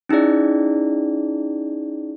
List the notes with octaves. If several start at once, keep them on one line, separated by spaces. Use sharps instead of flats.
C#4 D#4 E4 G#4 D5